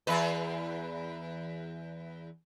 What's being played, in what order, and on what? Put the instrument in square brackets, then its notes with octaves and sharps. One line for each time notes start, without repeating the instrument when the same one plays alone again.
[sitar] E2 B4